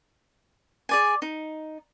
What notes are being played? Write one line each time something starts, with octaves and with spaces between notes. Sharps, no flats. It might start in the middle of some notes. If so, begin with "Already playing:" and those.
G#4 D5 G#5
D#4